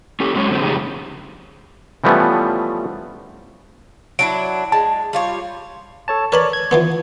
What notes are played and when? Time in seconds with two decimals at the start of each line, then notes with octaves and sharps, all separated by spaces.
0.20 C#4 G4 A4
0.35 F#3 G#3 C#4 C#5
0.49 F#2 D3 C4
0.61 F2 A2 C#3 D#4 G4 G#4
2.04 E3 F3 G3 A3 B3 C#4
4.19 F#3 D4 E4 D7
4.72 G#3 A5
5.13 G3 F4 C#5
6.08 A4 C#5 A5
6.32 A#4 B4 C#5 D5 A5 B5
6.53 G#6
6.71 E3 F3 B3